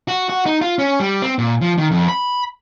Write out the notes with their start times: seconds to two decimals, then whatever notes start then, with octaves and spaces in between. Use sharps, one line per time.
0.08 F#4
0.30 F#4
0.46 D#4
0.61 F4
0.79 C#4
1.00 G3
1.22 C4
1.39 A#2
1.61 F3
1.78 D#3
1.92 F2
2.08 B5